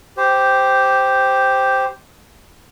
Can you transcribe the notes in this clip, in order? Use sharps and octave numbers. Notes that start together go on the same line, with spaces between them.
G4 C5